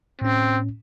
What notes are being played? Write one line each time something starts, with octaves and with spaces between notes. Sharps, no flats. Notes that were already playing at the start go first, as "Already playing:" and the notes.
A2 C4 C#4